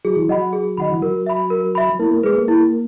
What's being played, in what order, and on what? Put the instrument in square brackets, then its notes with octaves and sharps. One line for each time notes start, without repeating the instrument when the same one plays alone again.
[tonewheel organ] F#3 [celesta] G#4
[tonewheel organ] E3
[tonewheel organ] F#3 [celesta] D#5 F#5 B5
[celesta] G#4
[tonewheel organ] D#3 [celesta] D#5 F#5 B5
[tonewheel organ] E3
[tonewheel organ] F#3 [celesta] A#4
[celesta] E5 B5
A#4
E5 B5
[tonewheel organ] A#3 [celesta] E4
[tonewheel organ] A#3
[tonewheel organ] G#3 [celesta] G#4 B4
[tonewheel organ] A#3
[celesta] E4